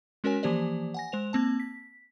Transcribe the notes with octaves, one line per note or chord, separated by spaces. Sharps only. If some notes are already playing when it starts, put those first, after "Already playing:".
G#3 C#4 F#4 A#4 C#5 G#5
E3 F3 A#3 G4 C5 D5
F#5 G#5 A#6
G#3 C5 F7
A#3 C4 A5
B6